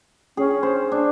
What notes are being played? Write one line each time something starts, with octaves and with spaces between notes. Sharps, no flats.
C#4 G#4
C5
D4